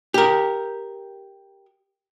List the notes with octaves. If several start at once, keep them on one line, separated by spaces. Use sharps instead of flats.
G4 A#4